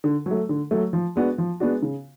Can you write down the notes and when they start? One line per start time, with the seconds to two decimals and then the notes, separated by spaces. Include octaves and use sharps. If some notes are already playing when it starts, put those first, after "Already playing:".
0.04 D3
0.26 F#3
0.31 A3
0.49 D3
0.71 F#3 A3
0.93 F3
1.16 G#3 B3 D4 F#4
1.38 F3
1.60 G#3 B3 D4 F#4
1.82 C#3